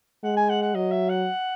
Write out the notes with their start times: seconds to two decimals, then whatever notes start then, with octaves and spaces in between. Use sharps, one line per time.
0.24 G#3 F#5
0.37 G#5
0.50 F#5
0.62 F#5
0.75 F#3 D#5
0.92 E5
1.09 F#5